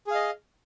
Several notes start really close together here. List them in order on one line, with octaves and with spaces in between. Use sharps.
G#4 F5 D#5